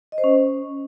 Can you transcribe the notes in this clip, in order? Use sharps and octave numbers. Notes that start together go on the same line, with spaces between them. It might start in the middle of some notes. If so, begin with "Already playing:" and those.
D#5
C5
C#4